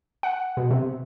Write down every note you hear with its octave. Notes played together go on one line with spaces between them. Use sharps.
F#5
B2
C3